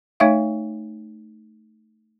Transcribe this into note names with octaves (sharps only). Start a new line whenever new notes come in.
A3 D#4 C#5 E5 F5